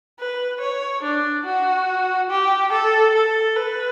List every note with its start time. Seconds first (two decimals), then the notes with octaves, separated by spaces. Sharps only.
0.19 B4
0.61 C#5
1.03 D4
1.45 F#4
2.30 G4
2.72 A4
3.15 A4
3.56 B4